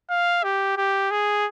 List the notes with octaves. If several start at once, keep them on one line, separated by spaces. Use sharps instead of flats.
F5
G4
G4
G#4